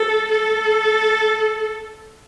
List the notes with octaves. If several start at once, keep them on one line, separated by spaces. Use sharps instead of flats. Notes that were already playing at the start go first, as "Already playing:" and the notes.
Already playing: A4
A4